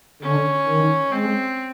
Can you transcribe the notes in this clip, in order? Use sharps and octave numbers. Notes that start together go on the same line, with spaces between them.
D3 C#4
D#3
G#3 C4